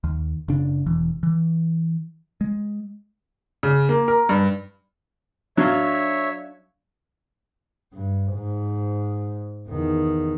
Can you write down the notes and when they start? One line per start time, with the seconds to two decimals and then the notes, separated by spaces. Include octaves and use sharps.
0.04 D#2
0.48 F#1 C#3 D4
0.86 E1 E3
1.23 E3
2.41 G#3
3.63 C#3
3.89 A#3
4.08 A#4
4.29 G2
5.57 F#3 D4 C#5 E5 F5
7.93 G2
8.33 G#2
9.68 E2 D#3